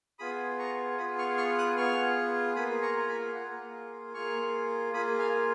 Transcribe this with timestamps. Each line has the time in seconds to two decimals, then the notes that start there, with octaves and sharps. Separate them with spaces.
0.19 B3 F4 G#4 B5 D#6
0.59 A#5 C#6
0.98 B3 F4 G#4 B5 D#6
1.18 C#6 F6
1.37 C#6 F6
1.58 D#6 F#6
1.77 B3 F4 G#4 C#6 F6
2.56 A#3 F4 G#4 B5 D#6
2.82 A#5 C#6
2.98 A#5
3.09 G#5 B5
3.35 A#3 F4 G#4 F#5 A#5
4.14 A#3 F4 G#4 C#6 F6
4.93 A#3 F4 G#4 B5 D#6
5.19 F5 G#5